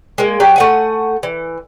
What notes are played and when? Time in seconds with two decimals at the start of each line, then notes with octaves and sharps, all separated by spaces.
0.18 G#3 A#3
0.40 F#3 G4
0.56 A3 F#5 G#5
1.23 E3